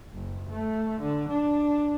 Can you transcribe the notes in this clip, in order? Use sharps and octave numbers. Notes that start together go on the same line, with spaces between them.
F#1
A3
D3
D4